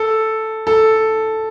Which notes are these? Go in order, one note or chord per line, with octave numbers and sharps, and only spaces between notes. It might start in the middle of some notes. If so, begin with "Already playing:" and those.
Already playing: A4
A4